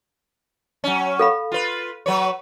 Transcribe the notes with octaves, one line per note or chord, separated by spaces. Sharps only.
F#3 C#4
A4 F5 B5
F4 B4
F#3 B4 C#5